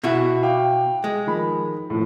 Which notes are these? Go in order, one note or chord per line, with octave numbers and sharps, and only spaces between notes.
B2 E4 F#4
F5 G5 D6
G#3
D#3 F3 B5
A2 F3